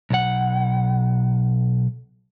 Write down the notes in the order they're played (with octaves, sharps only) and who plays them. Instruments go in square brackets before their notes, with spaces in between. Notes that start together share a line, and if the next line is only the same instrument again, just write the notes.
[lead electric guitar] B1 F#5